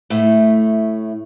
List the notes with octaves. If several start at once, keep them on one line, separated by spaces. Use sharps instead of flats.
A2 A3